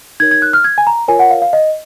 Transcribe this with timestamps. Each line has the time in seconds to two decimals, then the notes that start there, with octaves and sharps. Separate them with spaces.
0.20 D#4 A#4 C#5 G#6
0.31 G#6
0.42 F#6
0.53 F6
0.64 G#6
0.78 G#5
0.87 A#5
1.08 F4 A#4 C#5 G#5
1.19 F#5
1.31 F5
1.42 F5
1.53 D#5